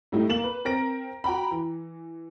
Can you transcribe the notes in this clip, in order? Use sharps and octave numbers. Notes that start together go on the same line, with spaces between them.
A2 G3 D#4 E4
A#3 E7 F#7
B4
C4 A#4 A#6 D7
F#4 G5 A#5 B5
E3